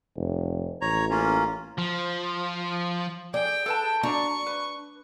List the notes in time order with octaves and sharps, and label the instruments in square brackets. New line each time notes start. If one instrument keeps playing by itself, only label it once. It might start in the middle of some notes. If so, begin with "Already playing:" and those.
[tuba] F1
[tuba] A1 [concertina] C#5 A#5
[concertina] A#3 C#4 F4
[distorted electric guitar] F3
[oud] G#4 [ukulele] D5 [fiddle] G5
[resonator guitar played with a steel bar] A4 B4 A5 [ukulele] F#5
[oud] D4 [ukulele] F#4 D5 A5 [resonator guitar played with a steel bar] A#5 [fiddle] C#6
[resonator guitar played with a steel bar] B4